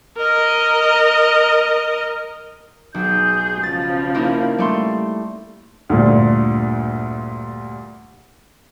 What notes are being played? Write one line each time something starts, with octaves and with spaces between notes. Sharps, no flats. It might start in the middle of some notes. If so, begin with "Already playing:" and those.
A#4 D#5
B1 G#4 G6
C#3 F3 A6
A#3 D#4 E4
G3 A3 C6
D2 G2 A#2